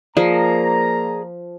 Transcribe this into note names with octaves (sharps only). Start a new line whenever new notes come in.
F3 A#3 G#4 D5 A#5